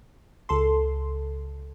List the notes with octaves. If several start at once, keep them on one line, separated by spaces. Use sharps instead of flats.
C#2 A4 C6